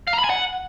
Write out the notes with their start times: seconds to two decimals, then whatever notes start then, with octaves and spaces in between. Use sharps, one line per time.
0.07 F5
0.13 A#5
0.19 B5
0.24 G#5
0.30 F#5